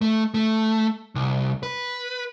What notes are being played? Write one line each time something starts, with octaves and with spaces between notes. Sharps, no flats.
A3
A3
C2
B4